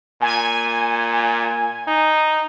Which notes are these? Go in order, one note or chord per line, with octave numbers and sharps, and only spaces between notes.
A#2 G#5
D#4